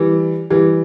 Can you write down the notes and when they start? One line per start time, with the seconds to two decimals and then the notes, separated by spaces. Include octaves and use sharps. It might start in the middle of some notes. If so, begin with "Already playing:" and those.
Already playing: E3 G3
0.50 E3 G3